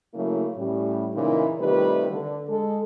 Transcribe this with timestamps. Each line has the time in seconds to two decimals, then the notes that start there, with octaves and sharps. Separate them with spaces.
0.14 C#3 F#3 A3 A#3 E4
0.57 A2 G3 C#4
1.14 A#2 C#3 E3 A#3 D#4
1.61 C3 D#3 G3 A3 F4 B4
2.10 D3
2.49 G#3 A4